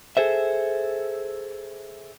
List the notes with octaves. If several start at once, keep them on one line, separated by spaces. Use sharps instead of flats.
G#4 A4 C5 E5